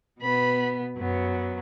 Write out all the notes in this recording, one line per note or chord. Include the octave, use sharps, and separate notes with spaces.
B2 B3 B5
F#2 F#3 B3